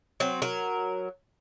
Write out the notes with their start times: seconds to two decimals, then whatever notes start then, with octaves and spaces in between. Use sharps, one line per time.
0.20 F#3 C4
0.42 F#3 A#4